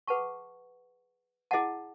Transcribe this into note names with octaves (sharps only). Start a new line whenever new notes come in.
G#4 B4 F#5 A5 C#6
E4 G#4 D#5 F#5 A5